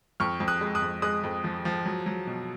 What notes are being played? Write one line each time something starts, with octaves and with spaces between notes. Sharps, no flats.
F2 C#6 F6
F2
D#6 F#6
G#3
D#6 F#6
F2
G#3 D#6 F#6
F2
F3
F3
F#3
F#3
B2